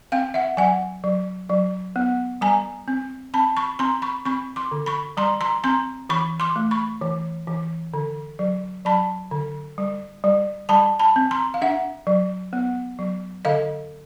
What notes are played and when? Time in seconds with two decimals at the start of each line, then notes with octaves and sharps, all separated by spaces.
0.12 C4 F5 G5
0.34 E5 F#5
0.57 F#3 F#5 G#5
1.04 F#3
1.49 F#3
1.96 B3
2.41 G3 G#5 A#5
2.88 C4
3.34 C4 A5 B5
3.57 B5 C#6
3.79 C4 A#5 C6
4.02 B5 C#6
4.25 C4 B5 C#6
4.56 C6 D6
4.71 D3
4.86 B5 C#6
5.17 G3 A#5 C6
5.41 A#5 C6
5.64 C4 A#5 C6
6.09 E3 B5 C#6
6.40 C6 D6
6.56 A3
6.71 B5 C#6
7.01 E3
7.47 E3
7.94 D3
8.39 F#3
8.85 F#3 A5 B5
9.31 D3
9.78 G3
10.24 G3
10.69 G3 A5 B5
10.99 A5 B5
11.16 C4
11.31 A#5 C6
11.54 F5
11.62 D4 E5 F#5
12.07 F#3
12.53 B3
12.99 F#3
13.45 D3 D#5 F5